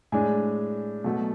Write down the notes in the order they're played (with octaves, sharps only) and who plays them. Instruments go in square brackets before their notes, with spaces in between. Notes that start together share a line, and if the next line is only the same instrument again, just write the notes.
[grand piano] A2 G#3 D4 G#5
B2 F#3 A3